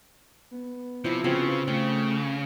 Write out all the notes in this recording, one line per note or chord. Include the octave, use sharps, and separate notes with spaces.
B3
C3 F3 C4 E4
C#3 C4 F4 F#4
C#3 A3 F4 G5